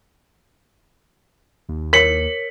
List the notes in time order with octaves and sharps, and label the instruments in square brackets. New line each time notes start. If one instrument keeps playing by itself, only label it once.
[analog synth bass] D#2
[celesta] A#4 C#5 C#7 [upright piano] B6 F#7